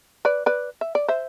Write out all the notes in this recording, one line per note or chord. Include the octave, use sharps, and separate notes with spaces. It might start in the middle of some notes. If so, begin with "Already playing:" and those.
B4 D5
B4 D5
E5
D5
C5 E5